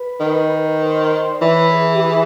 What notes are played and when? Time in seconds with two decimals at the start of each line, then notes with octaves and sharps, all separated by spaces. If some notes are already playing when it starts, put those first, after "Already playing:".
Already playing: B4
0.20 D#3
0.80 C5
1.30 D5
1.41 E3 B4 C#5
1.71 G#4
1.94 G4
2.02 G#4